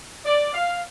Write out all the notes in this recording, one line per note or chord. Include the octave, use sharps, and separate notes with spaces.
D5
F5